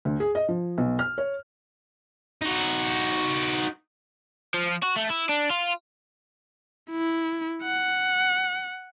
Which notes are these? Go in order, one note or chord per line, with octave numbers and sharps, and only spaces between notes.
D2
G#4
D#5
F3
B1
F6
C#5
D#4 F#4
F3
F#4
A3
E4
D4
F4
E4
F#5